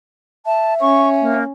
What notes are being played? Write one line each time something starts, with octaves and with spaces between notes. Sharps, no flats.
E5 A5
C#4 C#6
A#3